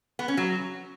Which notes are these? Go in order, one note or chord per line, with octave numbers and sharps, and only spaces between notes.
B3
C#4
F#3